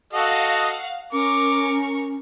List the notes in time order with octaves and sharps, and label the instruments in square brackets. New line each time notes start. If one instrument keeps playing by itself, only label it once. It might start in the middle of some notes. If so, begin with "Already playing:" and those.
[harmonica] F#4 A4 D#5 [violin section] F5 F#5
[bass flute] C#4 [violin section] A#4 C#6 [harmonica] D6